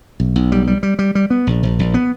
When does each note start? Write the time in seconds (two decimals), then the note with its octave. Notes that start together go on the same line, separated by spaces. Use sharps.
0.20 B1
0.36 B1
0.52 G3
0.67 G3
0.83 G3
0.99 G3
1.15 G3
1.30 B3
1.47 A#1
1.63 A#1
1.79 A#1
1.94 B3